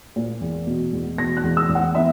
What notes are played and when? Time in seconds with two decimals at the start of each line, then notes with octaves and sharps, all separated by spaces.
0.16 A#2
0.41 E2
0.67 B2
0.93 E2
1.18 B2 A#6
1.37 F#6
1.44 E2
1.57 E6
1.69 E2
1.75 F#5
1.95 B3 E5